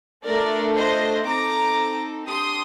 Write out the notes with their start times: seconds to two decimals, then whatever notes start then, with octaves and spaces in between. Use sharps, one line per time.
0.24 A3 D4 F4 A4 A#4 D5
0.75 C5 D#5
1.26 C4 D#4 A4 A#5 D6
2.28 D4 G4 C6 D#6